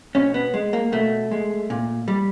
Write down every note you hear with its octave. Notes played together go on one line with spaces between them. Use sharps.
B2 C#4
B3
G#3
A#3
B2 A3
G#3
A#2
G3